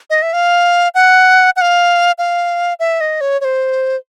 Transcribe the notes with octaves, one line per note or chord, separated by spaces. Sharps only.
D#5
E5
F5
F#5
F#5
F5
F5
E5
D#5
C#5
C#5
C5